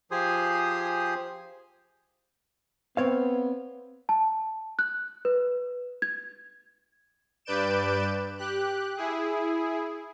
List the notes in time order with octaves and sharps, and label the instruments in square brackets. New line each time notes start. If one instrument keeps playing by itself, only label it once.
[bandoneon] F3 G4 G#4 C5 G#5 D#6
[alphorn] B3 [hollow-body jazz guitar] C4 C#5 F5
[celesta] A5
F#6
B4
G#6
[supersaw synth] G2 B4 D5 G6 D7 E7
G4 F#6
E4 G#4